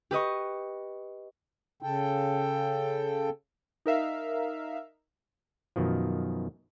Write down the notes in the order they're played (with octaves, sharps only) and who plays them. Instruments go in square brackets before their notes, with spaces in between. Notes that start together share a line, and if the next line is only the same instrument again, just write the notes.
[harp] G4 B4 D#5 C#6
[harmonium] C#3 A4 G5
[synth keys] D#4 A#4 E5 F5
[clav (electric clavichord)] F#2 B2 D#3 F3